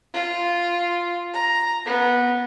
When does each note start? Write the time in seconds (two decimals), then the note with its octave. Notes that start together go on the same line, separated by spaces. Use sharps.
0.14 F4
1.34 A#5
1.86 B3